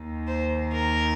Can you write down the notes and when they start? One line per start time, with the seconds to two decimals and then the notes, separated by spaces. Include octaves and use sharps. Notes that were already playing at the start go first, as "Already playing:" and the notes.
Already playing: D#2 D#3
0.27 C5
0.74 A#4